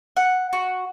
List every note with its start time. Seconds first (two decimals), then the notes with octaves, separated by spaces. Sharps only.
0.16 F#5
0.53 F#4